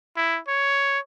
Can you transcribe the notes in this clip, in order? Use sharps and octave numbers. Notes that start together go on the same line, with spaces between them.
E4
C#5